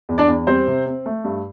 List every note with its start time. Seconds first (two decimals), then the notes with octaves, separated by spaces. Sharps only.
0.09 E2
0.18 D4 D5
0.28 E2
0.47 G3 C4 C5
0.67 C3
0.86 C4
1.06 A3
1.24 G2